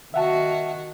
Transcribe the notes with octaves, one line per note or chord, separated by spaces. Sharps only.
D#3 F#4 E5 F#5 A5